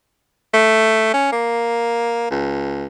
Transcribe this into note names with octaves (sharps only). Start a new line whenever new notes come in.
A3
C#4
A#3
C#2